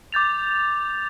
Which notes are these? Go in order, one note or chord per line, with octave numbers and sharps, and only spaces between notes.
D6 G6 A6 F7